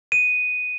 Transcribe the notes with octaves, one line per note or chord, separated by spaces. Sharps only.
D#7